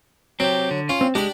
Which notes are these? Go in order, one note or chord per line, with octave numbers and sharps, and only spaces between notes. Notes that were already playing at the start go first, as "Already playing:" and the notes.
F#3 C4 G4
D3
C#4 F4
C4
G#3 D4 G4 B5